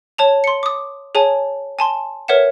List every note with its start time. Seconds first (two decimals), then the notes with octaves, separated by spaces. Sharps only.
0.18 C#5 A5 F7
0.44 C6 C#7
0.63 D6 D#6
1.15 G#4 C#5 G#5 A5
1.79 G#5 A5 C6
2.28 A#4 B4 C#5 E5 F#5 E7